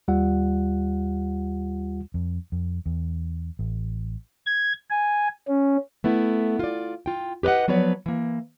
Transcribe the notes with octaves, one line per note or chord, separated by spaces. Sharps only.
D#2 G3 F4 F#5
F2
F2
E2
A1
G#6
G#5
C#4
A3 B3 E4
F4 D5
F4 G5
G4 B4 C5 D#5 F#5
F3 F#3 B3 B4 C#5 D5
E3 A#3